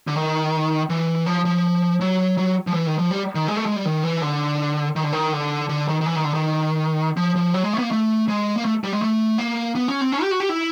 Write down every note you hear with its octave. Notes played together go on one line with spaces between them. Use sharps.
D3
D#3
E3
F3
F3
F#3
F#3
F3
E3
D#3
F3
G3
D#3
G#3
A3
G#3
G3
D#3
E3
D3
D#3
D3
D#3
D3
D3
D#3
D#3
E3
D#3
D3
D#3
F3
F3
F#3
G#3
A3
B3
A#3
A3
G#3
A#3
A3
G3
G#3
A3
A#3
B3
C#4
C4
C#4
G4
F#4
G4
E4